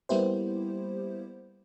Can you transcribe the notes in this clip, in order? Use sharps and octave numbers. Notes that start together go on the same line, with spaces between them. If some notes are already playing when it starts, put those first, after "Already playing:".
G3 A#3 B3 E4 G4 C5